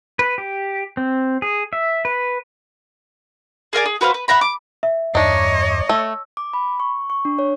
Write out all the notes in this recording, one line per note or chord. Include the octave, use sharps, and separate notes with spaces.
B4
G4
C4
G#4
E5
B4
G#4 A#4 D5 G#5
G#4
F#4 B4 C5 F5
B4
E5 F#5 A#5 B5
D6
E5
E2 G2 D4 D#4 C#5 D#5 D6
A3 E6
D6
B5
C#6
C#6
D4
C#5